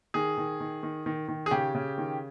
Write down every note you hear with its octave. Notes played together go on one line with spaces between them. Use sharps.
D#3 G#4
D#3
D#3
D#3
D#3
D#3
G#4
C#3 G4
C#3
D#3